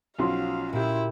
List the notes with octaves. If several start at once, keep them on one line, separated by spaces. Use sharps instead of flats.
B1 F3 C#4 F#4 F5 C6
A#2 E4 G4